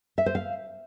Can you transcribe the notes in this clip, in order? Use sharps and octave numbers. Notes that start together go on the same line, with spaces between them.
E5
C5
F5